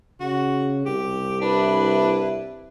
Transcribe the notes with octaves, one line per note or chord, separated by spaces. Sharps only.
C#3 F#4
C2 G4
D4 E4 B4